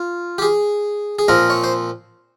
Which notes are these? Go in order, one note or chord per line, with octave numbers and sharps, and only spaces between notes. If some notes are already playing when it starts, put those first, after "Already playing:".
Already playing: F4
G4
G#4
G#4
A#2 F3 C4 A#4
C#5
C5